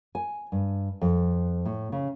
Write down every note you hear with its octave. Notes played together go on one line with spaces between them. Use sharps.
G#5
G2
F2
A2
C#3